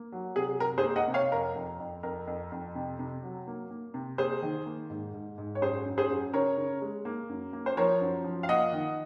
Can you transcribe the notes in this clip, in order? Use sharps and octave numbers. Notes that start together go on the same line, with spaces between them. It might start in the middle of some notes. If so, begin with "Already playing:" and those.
Already playing: A#3
F#3
C3 G#4
C3 A#4
G#4 C5
A#3
D#5 F#5
C3
C#5 F5
F2 A#4
F2
F2
F2 A#4
F2
F2
C3
C3
F#3
A#3
A#3
C3
A#3 G#4 C5
D#3
A#3
G#2
G#2
G#2
C#5
F#2 G#4 C5
F#2
G#4 C5
F#2
C#3 A#4 C#5
C#3
G#3
A#3
F#2
A#3
C5
F3 A#4 C#5
F#2
F3
F5
A#3 D#5 F#5
D#3